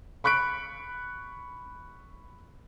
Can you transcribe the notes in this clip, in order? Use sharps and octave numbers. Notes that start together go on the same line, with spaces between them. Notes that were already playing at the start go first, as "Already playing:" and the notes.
B5 C#6 F#6 B6 D7